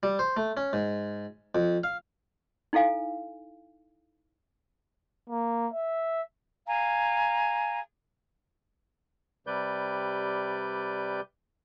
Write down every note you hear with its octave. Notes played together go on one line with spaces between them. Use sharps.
G3
C5
A3
C#4
G#2
F2
F5
D#4 E4 A4 F5 G#5
A#3
E5
F5 G#5 A#5
C3 G3 B4 D5 G6